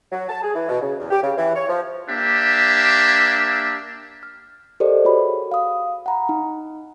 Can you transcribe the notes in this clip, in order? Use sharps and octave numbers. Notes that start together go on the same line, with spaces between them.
F#3
A5
G#4
E3
B2
C#3
E2
G4
C#3
E3
C#5
F3
A#3 D4 G4 E5
F6
G4 A4 A#4 C5 D5 D#5
F#4 G#4 C#5 B5
F5 D#6
F#5 A#5 B5
D#4